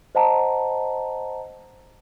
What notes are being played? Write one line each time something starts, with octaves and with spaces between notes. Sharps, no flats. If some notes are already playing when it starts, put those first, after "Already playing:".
C5 D#5 F#5 A5 A#5